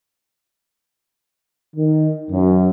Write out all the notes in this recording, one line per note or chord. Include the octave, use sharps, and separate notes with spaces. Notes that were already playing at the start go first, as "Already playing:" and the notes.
D#3
F#2